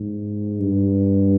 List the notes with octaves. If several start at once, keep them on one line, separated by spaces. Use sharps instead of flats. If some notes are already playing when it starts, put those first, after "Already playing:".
Already playing: G#2
G2